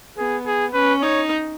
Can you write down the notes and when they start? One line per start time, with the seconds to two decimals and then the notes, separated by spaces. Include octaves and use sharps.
0.18 B3 G#4
0.46 G#4
0.74 C#4 B4
1.02 D#4 C#5